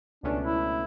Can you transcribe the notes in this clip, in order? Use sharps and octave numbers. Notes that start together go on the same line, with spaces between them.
C#2 B2 A3 C#4 D4
E4